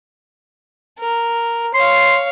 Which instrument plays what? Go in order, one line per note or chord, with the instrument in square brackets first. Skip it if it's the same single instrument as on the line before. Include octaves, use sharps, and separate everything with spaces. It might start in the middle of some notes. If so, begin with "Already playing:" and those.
[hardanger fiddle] A#4
[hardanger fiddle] C#5 F5 [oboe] C6